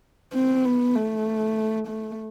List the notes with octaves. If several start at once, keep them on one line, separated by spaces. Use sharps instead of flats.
C4
B3
A3
A3